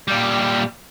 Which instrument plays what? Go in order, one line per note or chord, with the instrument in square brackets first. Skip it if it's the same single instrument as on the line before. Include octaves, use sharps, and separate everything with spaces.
[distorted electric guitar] A#2 G3